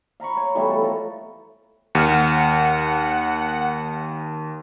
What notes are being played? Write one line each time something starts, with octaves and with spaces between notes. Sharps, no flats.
F5 A#5 B5 C#6
C#5 G#5
B2 E3 G3 A3
A4
F3 F4 A#4
D#2 F#5 F6